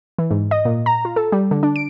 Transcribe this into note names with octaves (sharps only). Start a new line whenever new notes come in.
E3
G#2
D#5
A#2
A#5
F4
A4
G3
D3
D4
D7